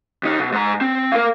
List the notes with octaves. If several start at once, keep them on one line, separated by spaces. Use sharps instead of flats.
D#2 D#4
B2
G#2 A#5
C4
A#4 F5